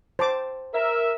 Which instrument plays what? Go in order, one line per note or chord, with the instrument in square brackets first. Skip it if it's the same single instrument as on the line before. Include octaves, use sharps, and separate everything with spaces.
[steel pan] C5 A5 D6
[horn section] A#4 E5